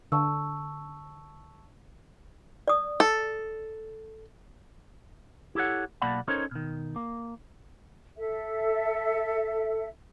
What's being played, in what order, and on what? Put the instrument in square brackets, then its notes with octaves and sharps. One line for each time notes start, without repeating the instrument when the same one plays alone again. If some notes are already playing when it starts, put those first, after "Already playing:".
[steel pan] D3 [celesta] A5 C#6 E6
[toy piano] D5 D#6
[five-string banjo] A4
[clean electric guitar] E4 G4 A4 C#5 F#5
B1 A#3 D5 F#5 A5 B5
C#4 D#4 A4 A#4 C5 C#5
B2 D#3
A#3
[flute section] A4 E5